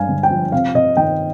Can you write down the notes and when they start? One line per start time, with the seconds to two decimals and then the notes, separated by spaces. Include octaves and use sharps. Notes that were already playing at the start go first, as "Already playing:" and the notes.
Already playing: G2 G#3 F5 G#5
0.09 D3
0.23 G5
0.30 F3
0.52 C3 F5
0.75 C3 D#5
0.97 D#3 G5